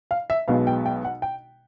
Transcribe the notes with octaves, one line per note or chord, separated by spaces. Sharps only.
F5
E5
B1 B2 G#3 B3 F5
G5
G5
F#5
G5